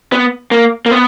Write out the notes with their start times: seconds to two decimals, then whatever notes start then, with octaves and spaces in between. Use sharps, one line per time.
0.12 B3
0.51 A#3
0.86 A#3
0.91 B3